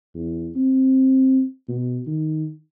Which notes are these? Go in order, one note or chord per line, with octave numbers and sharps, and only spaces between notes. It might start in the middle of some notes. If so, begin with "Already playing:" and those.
E2
C4
B2
D#3